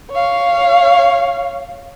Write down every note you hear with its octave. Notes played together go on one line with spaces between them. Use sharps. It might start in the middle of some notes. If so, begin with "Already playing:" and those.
C#5 F5